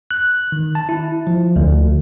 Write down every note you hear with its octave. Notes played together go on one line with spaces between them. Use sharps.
F#6
D#3
A5
E4
F3
D2